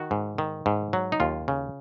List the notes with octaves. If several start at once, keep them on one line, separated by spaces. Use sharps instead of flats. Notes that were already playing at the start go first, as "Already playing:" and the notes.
Already playing: D#3 F#4
G#2
D#3
G#2
F#3
D#4
D#2 F4
C#3